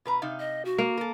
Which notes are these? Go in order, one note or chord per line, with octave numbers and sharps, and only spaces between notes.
B2 B4 A#5
C3 D#4 F5
D#5
F#4
A#3
A4 A#4